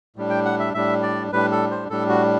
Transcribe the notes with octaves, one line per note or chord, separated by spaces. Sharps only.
A2 G3 D4
G5
F#5
E5
A2 G3 D4 E5
D5
A2 G3 D4 B4
A4
C5
A2 G3 D4 A4
F#4